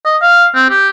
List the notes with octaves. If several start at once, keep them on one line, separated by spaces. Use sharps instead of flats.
D#5
F5
C4
G4